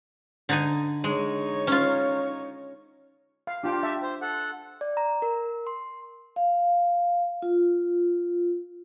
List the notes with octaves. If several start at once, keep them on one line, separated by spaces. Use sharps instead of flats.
D3 D#4 G#5
G#3 D#4 C#5
C#4 F4
F5
D4 F4 G4 G5
E5 A5
C5
A4 F#5
D5
A#5
A#4
C6
F5
F4